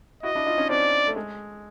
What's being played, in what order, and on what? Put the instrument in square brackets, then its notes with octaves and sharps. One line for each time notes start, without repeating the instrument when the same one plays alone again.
[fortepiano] E4 F#4 [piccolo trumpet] D#5
[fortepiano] D4 E4
D#4 F4
C#4 D#4
[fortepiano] C4 D4 [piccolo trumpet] D5
[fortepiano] A3
G#3